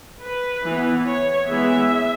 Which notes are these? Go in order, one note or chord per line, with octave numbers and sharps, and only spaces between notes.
B4
E3 B3
C#5
E3 G#3 B3 E5